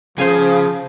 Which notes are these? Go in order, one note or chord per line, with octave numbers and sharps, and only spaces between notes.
C#3 F3 G#4 C5 F5 G#5